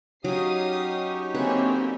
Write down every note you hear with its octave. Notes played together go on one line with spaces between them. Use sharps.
F#3 C#4 D#4 G4 F5 D#6 C7
D3 A#3 C4 B4 C#5 E5 G#5